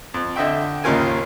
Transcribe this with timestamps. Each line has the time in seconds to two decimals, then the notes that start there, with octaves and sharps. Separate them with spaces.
0.14 F2
0.36 D3 D#5 E5 G5
0.84 G#1 D#2 C#3 F4 A#4 G#5